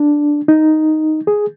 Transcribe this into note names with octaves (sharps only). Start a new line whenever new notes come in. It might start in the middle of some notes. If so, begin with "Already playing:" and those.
Already playing: D4
D#4
G#4